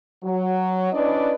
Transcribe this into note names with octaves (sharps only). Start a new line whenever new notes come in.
F#3
C#4 D4 E4 B4 D5 D#5